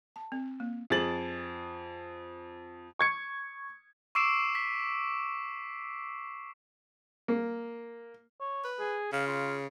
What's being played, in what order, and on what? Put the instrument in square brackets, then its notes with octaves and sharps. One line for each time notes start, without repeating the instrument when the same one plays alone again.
[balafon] A5
C4
A#3
[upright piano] F2 G#4 A5 A6 F#7
[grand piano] C#6 G#6 C#7
[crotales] C#6 D6 E6 C7 D7 E7
B6
[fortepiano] A#3
[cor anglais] C#5
[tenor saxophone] B4
[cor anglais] G#4
[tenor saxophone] C#3 [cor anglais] F5
[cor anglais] F4